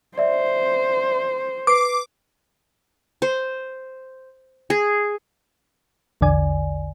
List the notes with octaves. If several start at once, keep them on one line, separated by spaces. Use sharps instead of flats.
C5 D5 E5
B4 D6 C7
C5
G#4
A#1 E2 D3 D5 G#5